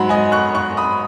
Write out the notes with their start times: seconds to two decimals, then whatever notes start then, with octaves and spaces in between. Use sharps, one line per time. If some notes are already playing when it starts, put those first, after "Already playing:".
Already playing: G#2 F#3 F#5 B5
0.09 D#5 G#5
0.32 C#6 F#6
0.55 C#6 F#6
0.77 B5 D#6